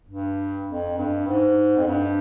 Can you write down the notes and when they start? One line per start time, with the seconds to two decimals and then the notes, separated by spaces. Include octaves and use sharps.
0.09 G2
0.68 F2
0.98 G2
1.27 G#2
1.77 F2
1.87 G2